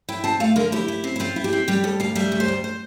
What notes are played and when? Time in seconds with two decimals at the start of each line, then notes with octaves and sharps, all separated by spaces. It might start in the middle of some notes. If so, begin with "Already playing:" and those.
0.09 E4 G5
0.24 C4 A5
0.40 A3 F5
0.56 D3 A#4
0.72 E4 G4
0.88 E4
1.04 C4
1.16 E4
1.20 C4 F4
1.36 E4
1.44 G4
1.53 C4
1.68 G3 G4
1.84 D2 A4
2.00 D2 F5
2.15 G3 E5
2.32 D2
2.40 C5
2.48 D2
2.64 C5